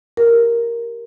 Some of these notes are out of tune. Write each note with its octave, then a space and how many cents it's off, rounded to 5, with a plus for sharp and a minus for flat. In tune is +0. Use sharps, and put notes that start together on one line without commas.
G4 +0 A#4 +0